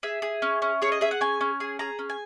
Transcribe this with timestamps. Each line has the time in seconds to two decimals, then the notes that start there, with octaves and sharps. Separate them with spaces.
0.03 G#4 E5
0.22 G#4
0.42 C#4
0.62 C#4
0.82 G#4 C#5
0.92 D#5
1.01 G#4 E5
1.11 F#5
1.21 C#4 G#5
1.41 C#4
1.60 G#4
1.79 G#4 A#5
1.99 C#4
2.10 G#5